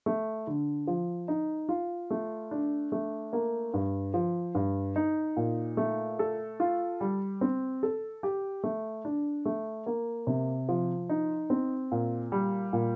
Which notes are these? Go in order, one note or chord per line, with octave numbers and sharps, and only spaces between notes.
A3
D3
F3
D#4
F4
A3
D4
A3
A#3
G2
F3
G2
D#4
A#2
A3
A4
F4
G3
C4
A4
G4
A3
D4
A3
A#3
C3
F3
D#4
C4
A#2
G3
A#2